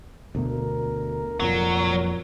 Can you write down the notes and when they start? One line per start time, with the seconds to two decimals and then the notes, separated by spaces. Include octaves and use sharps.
0.35 D2 B2 A3 A#4
1.40 F1 F2 A#2 F#3 A#4